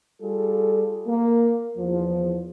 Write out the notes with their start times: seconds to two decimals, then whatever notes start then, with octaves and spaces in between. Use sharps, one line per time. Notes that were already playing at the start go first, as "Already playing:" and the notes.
0.22 G3 F4 G#4 A4
1.07 A#3
1.77 E2 F3